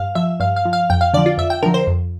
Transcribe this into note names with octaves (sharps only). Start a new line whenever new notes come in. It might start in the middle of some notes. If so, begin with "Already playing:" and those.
Already playing: G2 F5
F3 E5
G2 F5
F5
F3
F5
F2 G5
F5
D3 F3 D5
F4
F2 E5
G5
D3 F3 A#4
C5
F2